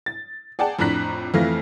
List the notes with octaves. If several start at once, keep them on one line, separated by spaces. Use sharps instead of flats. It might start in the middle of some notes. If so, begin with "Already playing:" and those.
A6
G#4 D5 F#5 G5 A5
F2 A2 D4 A#5 F#6 B6
F2 E3 A3 F5 F6 A#6